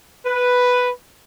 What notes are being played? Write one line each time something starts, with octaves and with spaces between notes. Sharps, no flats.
B4